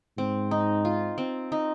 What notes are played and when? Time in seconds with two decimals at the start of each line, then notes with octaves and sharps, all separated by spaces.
0.18 G#2 C4
0.51 D#4
0.85 F4
1.18 C4
1.52 D#4